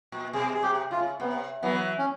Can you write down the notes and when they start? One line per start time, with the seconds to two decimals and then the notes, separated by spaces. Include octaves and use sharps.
0.12 A#2
0.33 B2 G#4
0.54 G#4
0.63 C3 G4
0.91 C#3 F4
1.20 C3 B3
1.63 E3 F#3 B3
1.98 C#4